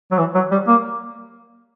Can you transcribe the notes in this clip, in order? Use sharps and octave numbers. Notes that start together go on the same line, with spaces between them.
F#3
E3
F#3
G3
A#3